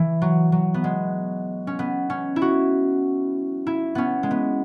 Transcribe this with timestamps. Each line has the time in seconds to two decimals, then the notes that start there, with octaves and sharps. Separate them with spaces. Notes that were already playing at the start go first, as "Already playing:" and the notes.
Already playing: E3
0.22 F#3
0.52 F#3
0.74 B3
0.84 G#3
1.67 C#4
1.79 B3
2.10 C#4
2.36 E4
2.42 F#4
3.67 E4
3.95 B3 C#4
4.23 G#3
4.31 B3